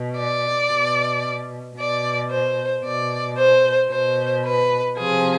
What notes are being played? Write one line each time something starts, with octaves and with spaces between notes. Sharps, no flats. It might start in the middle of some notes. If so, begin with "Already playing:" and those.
Already playing: B2
D5
B2
B2 D5
C5
B2 D5
C5
B2 C5
B4
C3 F3 G#4